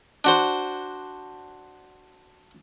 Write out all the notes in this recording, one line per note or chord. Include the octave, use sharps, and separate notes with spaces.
D4 F#4 C5